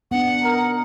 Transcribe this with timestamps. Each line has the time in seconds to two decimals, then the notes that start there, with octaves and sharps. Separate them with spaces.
0.11 B3 D4 F#5
0.43 D#4 A#4